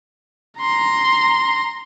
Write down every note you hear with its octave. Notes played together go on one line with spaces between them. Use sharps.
A#5 C6